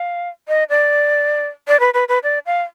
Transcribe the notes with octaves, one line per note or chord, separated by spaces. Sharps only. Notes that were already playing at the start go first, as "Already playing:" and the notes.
Already playing: F5
D#5
D5
D5
B4
B4
B4
D5
F5